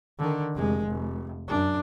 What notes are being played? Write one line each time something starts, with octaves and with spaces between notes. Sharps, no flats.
D3 D#3
F1 G#3
F1
F#2 D4